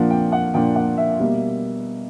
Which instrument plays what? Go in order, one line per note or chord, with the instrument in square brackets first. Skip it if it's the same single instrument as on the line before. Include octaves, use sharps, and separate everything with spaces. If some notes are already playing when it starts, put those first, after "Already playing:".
Already playing: [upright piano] A#2 F3 A#3 D4 F#5
G5
F#5
A#2 F3 A#3 D4 G5
F#5
E5
B2 G3 A#3